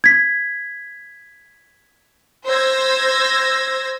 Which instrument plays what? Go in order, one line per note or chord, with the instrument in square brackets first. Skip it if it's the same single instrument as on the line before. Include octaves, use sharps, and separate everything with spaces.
[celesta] G#6 B6
[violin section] C5 E6 G#6 A#6